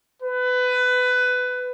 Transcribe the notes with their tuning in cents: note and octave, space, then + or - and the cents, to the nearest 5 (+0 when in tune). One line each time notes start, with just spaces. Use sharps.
B4 +20